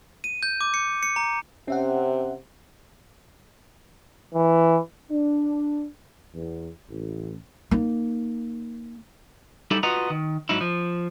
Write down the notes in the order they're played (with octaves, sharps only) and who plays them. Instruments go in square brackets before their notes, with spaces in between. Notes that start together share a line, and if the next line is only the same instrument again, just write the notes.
[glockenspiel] D#7
G6
D6
C#7
C#7
A#5
[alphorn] C3 [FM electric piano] C#4 E5 F#5
[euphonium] E3
[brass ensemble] D4
E2
A1
[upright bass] A#3 D#4
[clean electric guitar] G3 D#4 E4 G4 A4
F4 F#4 B4 D#5 F#5 A#5
D#3
G#2 F#3 D#4 E4
F3